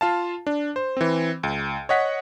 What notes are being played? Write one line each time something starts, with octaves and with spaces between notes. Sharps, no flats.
F4 F5 A5
D4
C5
E3 C4
C#2
C#5 D#5 F#5 B6